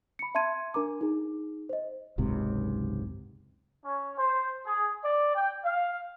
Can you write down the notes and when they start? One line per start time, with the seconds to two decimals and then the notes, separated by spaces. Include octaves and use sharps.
0.19 B5 C#7
0.35 E5 A5 C6 G#6 D#7
0.74 D4 A#4 A#5 D6
1.01 D#4 G#4
1.69 C5 D#5
2.18 F#1 C#2 G#2 C3
3.85 C#4
4.18 C5
4.65 G#4
5.04 D5
5.35 G5
5.64 F5